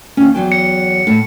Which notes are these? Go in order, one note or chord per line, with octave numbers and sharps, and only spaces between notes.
D#2 C#4
E2 F#3 G5
C#7
A2